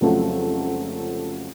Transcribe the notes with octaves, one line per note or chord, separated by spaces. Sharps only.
F1 C#2 F3 F#3 A3 A4